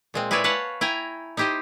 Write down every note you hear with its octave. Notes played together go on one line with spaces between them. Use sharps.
A#2 G#3 C4
E4 G#4 B4 C#5 D5 E5
B4 C#5 F5 F#5 A5
E4 G5 G#5 A#5
D#4 E4 G4 C5 D#5